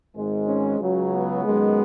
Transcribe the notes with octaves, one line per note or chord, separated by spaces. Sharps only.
G#1 G#2 G#3
C#4
C#2 C#3 F#3
B3
F#2 D#3 G#3